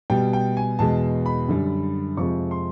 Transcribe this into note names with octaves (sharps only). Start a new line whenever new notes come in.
B2 G3 G5
G5
G#5
E2 B2 G#3 A5
B5
F#2 D3 G3
F2 C3 F3 G#3 C#6
C6